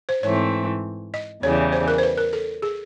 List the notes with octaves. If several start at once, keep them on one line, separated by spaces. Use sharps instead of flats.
C5
G#2 E3 A3 C4 C#5
D#5
E2 C#3 E3 G3 C#5
C5
A#4
C5
B4
A#4
A4
G#4